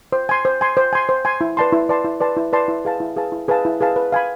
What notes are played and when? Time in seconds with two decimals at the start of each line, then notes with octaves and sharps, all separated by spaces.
0.12 C5
0.29 G#5 C6
0.45 C5
0.61 G#5 C6
0.77 C5
0.93 G#5 C6
1.09 C5
1.25 G#5 C6
1.41 E4
1.57 B4 D5 A5 C6
1.73 E4
1.89 B4 D5 A5 C6
2.05 E4
2.20 B4 D5 A5 C6
2.37 E4
2.53 B4 D5 A5 C6
2.68 E4
2.85 G#4 B4 F5 A5
3.00 E4
3.16 G#4 B4 F5 A5
3.32 E4
3.48 G#4 B4 F5 A5
3.65 E4
3.81 G#4 B4 F5 A5
3.96 B4
4.12 F5 G#5 B5